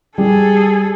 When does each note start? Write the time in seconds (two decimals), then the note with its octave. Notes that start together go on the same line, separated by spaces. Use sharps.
0.18 G3 G#4 A4